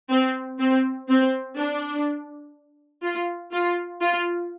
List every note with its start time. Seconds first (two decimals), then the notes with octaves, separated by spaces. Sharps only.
0.11 C4
0.59 C4
1.09 C4
1.57 D4
3.03 F4
3.52 F4
4.01 F4